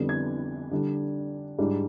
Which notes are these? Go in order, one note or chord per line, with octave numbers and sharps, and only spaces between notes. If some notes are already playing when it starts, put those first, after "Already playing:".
Already playing: F2 D3 G3 B3
G#6
D3 G3 D4
G#2 G3 D4